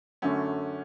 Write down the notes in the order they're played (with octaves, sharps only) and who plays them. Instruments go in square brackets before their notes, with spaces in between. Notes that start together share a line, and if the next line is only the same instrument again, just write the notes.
[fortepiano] F#2 D3 A3 [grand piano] C#4